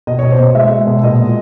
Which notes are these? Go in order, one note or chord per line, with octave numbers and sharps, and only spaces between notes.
B2 D#5
B2 C#5
C5
B2
G#3 E5
G#3
B2
A#2 D#5
G#3